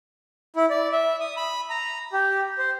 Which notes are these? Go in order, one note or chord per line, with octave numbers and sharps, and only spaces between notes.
E4
D5
E5
D#6
B5
A#5
G4
C5